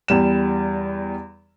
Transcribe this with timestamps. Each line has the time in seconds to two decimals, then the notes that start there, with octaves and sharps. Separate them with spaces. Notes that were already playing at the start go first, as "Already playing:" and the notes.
0.08 E2 G3 E7